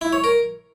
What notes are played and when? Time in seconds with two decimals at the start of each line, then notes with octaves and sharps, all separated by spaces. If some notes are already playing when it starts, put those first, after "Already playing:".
0.01 E4
0.13 C#5
0.24 A#4